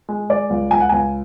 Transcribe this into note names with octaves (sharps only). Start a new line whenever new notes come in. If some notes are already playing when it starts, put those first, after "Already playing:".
G#3
G#3 D5
C#2
C#2 G#5
F#5
C#2 G#5